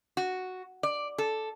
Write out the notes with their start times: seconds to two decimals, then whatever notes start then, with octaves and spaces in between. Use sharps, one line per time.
0.17 F#4
0.83 D5
1.18 A4